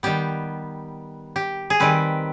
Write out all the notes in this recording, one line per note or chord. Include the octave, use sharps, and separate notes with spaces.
D#3 G3 B3 G4
G4
G#4
D#3 G3 C4 B4